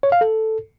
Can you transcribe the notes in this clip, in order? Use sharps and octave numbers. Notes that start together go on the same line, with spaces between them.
C#5
F5
A4